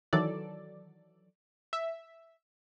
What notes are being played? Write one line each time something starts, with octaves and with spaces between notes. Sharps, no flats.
D#3 E3 F#3 A4 D5
E5